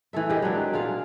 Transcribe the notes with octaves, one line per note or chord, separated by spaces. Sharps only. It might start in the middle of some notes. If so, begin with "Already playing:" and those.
E3 A3 A4 E5
G4 G#4 A#4 D#5
F#3 G#3 D4
D4 F4 G#4 F5